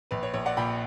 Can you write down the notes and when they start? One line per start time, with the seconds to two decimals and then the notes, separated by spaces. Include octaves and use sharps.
0.11 A#1 B4
0.23 C#5
0.34 A#1 C#5
0.46 D5 F#5
0.57 A#2 G5 B5